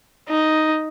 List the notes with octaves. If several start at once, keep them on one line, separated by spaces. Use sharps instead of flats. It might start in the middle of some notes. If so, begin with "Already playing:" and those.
D#4